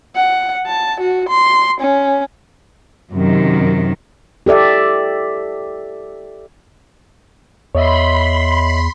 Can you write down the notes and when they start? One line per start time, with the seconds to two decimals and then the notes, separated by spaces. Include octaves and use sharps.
0.16 F#5
0.66 A5
1.01 F#4
1.29 C6
1.81 C#4
3.13 F#2 C3 D#3
4.46 G4 A4 D5 E5
7.75 E2 C#5 D#5 E5 B5 C6